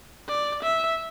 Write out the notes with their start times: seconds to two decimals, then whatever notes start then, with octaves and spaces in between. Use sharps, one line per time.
0.29 D5
0.63 E5